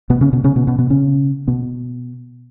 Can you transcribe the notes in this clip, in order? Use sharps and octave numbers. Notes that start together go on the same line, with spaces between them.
B2 B3
C#3 C#4
B2 B3
C#3 C#4
B2 B3
B2 B3
B2 B3
C#3 C#4
B2 B3